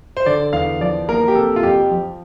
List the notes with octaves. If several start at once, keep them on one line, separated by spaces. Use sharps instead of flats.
C5
D3 D5
E2 F5
F3 D5
A#3 A#4
G4
C3 A4
F4
F2 G4
F3